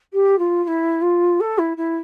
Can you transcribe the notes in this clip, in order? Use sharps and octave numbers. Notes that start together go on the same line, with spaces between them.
G4
F4
F4
E4
F4
A4
E4
E4